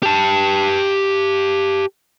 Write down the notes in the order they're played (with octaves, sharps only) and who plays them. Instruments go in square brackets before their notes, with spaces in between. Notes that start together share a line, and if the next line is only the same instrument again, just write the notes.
[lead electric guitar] G4 A5